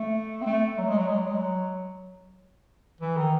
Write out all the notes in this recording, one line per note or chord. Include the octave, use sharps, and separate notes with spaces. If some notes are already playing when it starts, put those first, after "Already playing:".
Already playing: A3
C4
A3
F#3
G#3
F#3
G#3
F#3
G#3
F#3
E3
D#3